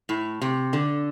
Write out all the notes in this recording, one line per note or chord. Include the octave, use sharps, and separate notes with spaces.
A2
C3
D3